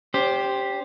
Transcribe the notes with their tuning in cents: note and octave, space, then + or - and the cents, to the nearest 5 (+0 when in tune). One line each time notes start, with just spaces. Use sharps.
C#4 +40 G4 +0 C5 +0